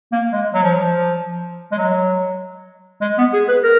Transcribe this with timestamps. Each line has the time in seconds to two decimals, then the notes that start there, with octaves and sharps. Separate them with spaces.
0.12 A#3
0.32 G#3
0.54 F#3
0.63 F3
0.83 F3
1.72 G#3
1.78 F#3
3.01 G#3
3.18 B3
3.33 G#4
3.48 B4
3.63 A#4